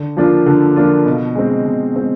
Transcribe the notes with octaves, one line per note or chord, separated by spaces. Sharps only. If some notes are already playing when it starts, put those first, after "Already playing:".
Already playing: D3
F3 A#3 D4 F4
D3
F3 A#3 D4 F4
B2
G#3 C4
B2
G#3 C4